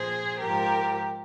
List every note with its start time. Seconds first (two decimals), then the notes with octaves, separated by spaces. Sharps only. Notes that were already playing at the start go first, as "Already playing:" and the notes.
Already playing: A#2 F3 G#4 C5
0.39 G#2 F3 G4 A#4